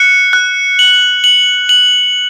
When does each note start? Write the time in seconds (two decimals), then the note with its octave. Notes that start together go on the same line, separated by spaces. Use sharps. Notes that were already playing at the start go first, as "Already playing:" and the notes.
Already playing: F#6 C#7
0.33 F#6
0.79 F#7
1.24 F#7
1.69 F#7